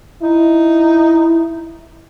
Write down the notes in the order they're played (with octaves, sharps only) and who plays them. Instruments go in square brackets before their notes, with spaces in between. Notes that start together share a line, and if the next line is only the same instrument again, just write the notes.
[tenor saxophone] D#4 [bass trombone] E4